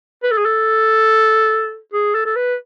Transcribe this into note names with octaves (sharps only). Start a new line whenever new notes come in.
B4
A4
G#4
A4
G#4
A4
A4
B4